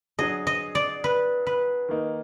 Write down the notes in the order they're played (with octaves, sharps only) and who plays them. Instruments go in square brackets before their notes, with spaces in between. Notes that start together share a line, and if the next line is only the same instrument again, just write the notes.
[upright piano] F#3 D4 G#4 [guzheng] D#5
[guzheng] D#5
D5
B4
B4
[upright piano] D#3 A#3 D#4